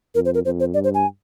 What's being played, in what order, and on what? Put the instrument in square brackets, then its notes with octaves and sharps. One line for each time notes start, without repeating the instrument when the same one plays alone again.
[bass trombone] F2 [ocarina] A#4
[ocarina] C5
A#4
[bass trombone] F2 [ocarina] C5
[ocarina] C5
[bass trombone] G2 [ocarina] D5
[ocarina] C5
G#5